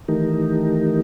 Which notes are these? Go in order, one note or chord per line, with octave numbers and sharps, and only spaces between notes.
D#3 E3 A3 D#4 G4 A#4